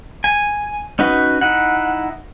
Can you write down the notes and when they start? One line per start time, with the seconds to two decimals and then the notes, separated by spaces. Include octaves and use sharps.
0.24 G#5
0.99 C#4 D#4 F#4 B4
1.41 D#4 E4 F#5